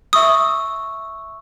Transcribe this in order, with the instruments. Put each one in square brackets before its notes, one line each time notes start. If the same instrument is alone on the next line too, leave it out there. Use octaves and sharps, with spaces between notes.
[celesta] E5 C#6 E6 [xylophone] D#6